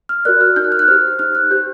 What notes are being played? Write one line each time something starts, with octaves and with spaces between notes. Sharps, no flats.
F6
F#4 A#4 D5 F#6
F6
D#4 G6
F#6
F6
F#6
G4 C5 F6
D#4 F6
F#6
G4 C5 G6